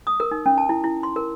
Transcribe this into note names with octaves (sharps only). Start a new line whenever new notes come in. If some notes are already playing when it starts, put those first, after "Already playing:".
D#6
A#4
D#4
C#4
A5
E4
E4
C6
A#4